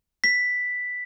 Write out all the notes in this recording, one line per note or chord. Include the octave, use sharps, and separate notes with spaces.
B6